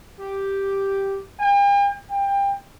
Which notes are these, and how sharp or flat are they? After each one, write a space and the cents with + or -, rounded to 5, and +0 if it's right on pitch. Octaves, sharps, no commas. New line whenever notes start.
G4 +0
G5 +45
G5 +25